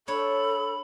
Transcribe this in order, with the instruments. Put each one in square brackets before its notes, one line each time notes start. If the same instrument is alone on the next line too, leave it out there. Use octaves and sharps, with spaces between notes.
[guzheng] D4 C#5 [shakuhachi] A4 [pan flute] B5